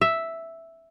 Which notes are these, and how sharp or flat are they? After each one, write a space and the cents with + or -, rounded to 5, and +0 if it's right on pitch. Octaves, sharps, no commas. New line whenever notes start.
E5 +0